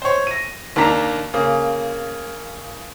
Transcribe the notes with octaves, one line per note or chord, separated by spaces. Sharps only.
C5 C#5
A#6 D#7
D#2 A#3 D4 A5 A#5 B6
C#3 A#3